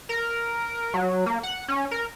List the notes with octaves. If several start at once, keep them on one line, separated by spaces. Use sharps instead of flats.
A#4
F#3
A#3
F#5
C#4
A#4